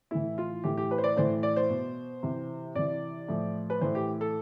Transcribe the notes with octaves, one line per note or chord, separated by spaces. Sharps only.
A2 E3 E4
F4
A2 E3 G4
G4
B4
C5
D5
A2 E3 C5
D5
C5
B2
C3 E3
C3 E3 D5
A2 F3
B4
A2 E3 C5
G4
A4